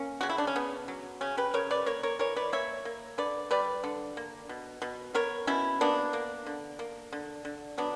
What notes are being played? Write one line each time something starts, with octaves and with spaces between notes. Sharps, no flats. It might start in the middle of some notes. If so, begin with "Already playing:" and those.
Already playing: A#3 C#4
C#3 F#4
E4
D4
C#4
C#3 B3
F#3
C#3 C#4
G4 B4
C#3 A#4 C#5
B4 D5
A#3 A#4 C#5
A#4 C#5
E3 A#4 C#5
B4 D5
A#3 C#5 E5
A#3
D3 B4 D5
G3 B4 D5
D3
A#3
B2
B2
B3 A#4 C#5
B2 C#4 E4
A#3 B3 D4
A#3
D3
A#3
D3
D3
F#3 B3 D4